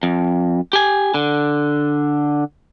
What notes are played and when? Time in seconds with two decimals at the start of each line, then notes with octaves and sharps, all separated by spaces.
0.03 F2
0.73 G4 G#5
1.14 D3